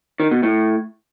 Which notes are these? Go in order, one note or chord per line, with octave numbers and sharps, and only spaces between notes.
D#3
B2
A2